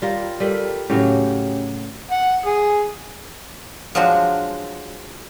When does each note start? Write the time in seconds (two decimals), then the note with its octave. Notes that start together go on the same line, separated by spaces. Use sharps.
0.02 G3 F4 A#4
0.40 G3 A4 A#4
0.90 A2 C#3 F#3 C#4 G4 G5
2.11 F#5
2.46 G#4
3.95 F3 F#3 G#3 D4 F#4